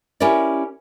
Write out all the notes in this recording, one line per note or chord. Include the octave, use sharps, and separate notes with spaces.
C#4 E4 G4 A#4 D5